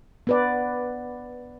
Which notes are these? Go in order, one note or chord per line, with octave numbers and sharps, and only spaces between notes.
B3 B4 D5